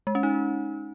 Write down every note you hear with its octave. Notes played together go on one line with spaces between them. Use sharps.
G#3
C#4
D#4